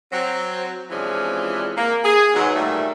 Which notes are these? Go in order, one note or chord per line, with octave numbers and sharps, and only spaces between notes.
F#3 C4
C3 E3 F3 G#3 C#4 D4
A#3
G#4
G#2 B2 F#3
A#2 D#3 G3 A3